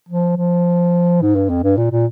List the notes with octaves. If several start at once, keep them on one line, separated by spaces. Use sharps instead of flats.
F3
F3
G#2
G2
F2
G2
A#2
A#2